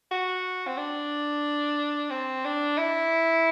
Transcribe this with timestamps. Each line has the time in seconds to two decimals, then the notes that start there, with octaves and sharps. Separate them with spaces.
0.11 F#4
0.67 C4
0.78 D4
2.11 C4
2.45 D4
2.78 E4